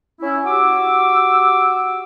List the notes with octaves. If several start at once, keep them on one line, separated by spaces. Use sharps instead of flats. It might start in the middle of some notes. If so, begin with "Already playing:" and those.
C#4 E4
F#4 G4 D6 E6